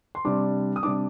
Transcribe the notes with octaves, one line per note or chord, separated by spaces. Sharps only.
C6
C3 G3 D4 D6
D#6
C3 G3 D4 D6